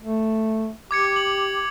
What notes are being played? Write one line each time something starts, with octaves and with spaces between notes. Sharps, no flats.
A3
G4 D6 G#6 C#7
F#7